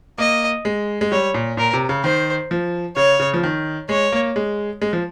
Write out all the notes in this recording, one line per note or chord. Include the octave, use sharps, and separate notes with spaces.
A#3 D#5
G#3
G#3
G3 C#5
A#2
A#2 A#4
C3
C#3
D#3 C5
F3
C#3 C#5
C#3
F3
D#3
G#3 C#5
A#3
G#3
G#3
F3